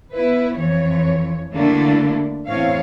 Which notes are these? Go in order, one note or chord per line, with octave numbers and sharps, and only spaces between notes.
B3 E4 B4
F2 E3 C#5
D3 G3 A3 A#3 D4 E4
E2 A2 C4 C#5 F5